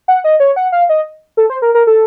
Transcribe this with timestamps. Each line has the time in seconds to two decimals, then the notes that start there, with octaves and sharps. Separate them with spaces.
0.08 F#5
0.24 D#5
0.40 C#5
0.56 F#5
0.72 F5
0.89 D#5
1.37 A4
1.50 C5
1.62 A#4
1.75 A#4
1.87 A4